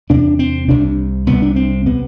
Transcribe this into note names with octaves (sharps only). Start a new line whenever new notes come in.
E2 C3 D4
C4
C2 C3 D4
C2 C3 B3
D4
C4
C3 B3